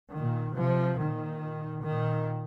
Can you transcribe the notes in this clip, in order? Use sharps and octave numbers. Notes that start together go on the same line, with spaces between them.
A#2 D#3
C3 F3
A#2 D#3
A#2 D#3